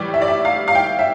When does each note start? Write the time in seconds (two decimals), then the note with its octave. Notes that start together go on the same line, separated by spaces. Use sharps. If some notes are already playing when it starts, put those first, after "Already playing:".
Already playing: A2 E3 G3 D5
0.14 E5
0.22 D5
0.28 E5
0.45 F5
0.68 F5
0.75 G5
0.99 E5